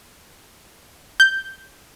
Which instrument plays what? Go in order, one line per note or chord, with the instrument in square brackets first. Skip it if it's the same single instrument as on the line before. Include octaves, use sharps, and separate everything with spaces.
[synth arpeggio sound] G6